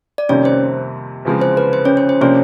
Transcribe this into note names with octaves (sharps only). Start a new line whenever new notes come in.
D5
F2 C3 D#3 G3 A#3 C#4 C#5
C5
E2 C#3 F3 G#3 C4
C5
B4
C5
C#4 C#5
C5
C5
C3 F3 A#3 C#4 D4 C#5